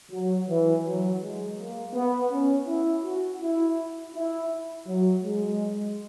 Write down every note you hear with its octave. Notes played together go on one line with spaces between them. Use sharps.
F#3
E3
F#3
G#3
A#3
B3
C#4
E4
F#4
E4
E4
F#3
G#3